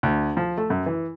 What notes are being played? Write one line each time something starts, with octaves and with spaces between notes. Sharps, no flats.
D2
F3
A3
F#2
E3